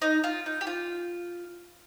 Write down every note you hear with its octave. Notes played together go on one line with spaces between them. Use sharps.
D#4
F4
D#4
G4
F4